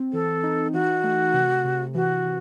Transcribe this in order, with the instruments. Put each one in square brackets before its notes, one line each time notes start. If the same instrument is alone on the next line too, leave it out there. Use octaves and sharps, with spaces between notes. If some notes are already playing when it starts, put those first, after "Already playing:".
Already playing: [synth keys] C4
[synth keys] E3 [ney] A4
[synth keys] D#4
[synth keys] E3 [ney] F#4
[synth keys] A3
C3
C3
[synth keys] E3 [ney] F#4
[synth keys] E3